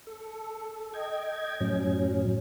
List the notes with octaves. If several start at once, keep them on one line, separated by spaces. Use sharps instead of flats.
A4
D#5 G5 G#6
F#2 A2 F#3 C#4